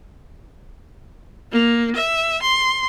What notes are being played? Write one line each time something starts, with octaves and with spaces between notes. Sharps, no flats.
A#3
E5
C6